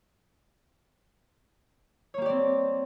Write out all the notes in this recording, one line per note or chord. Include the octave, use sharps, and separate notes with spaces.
A#3 C4 G4 C#5 D5